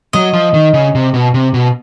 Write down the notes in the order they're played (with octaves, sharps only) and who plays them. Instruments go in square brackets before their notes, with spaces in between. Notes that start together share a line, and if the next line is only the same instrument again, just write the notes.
[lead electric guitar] F#3 [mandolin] D#5
[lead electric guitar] F3
D#3
C#3
C3
B2
C3
B2